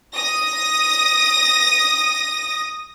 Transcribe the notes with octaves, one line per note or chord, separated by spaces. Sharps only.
D#6 A#6